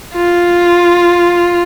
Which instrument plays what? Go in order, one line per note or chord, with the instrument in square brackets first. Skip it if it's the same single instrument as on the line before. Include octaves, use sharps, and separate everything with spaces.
[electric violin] F4